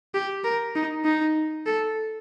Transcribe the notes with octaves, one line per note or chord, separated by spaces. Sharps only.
G4
A#4
D#4
D#4
A4